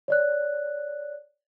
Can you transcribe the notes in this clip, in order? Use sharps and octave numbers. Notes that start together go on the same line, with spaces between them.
C#5 D5 F#6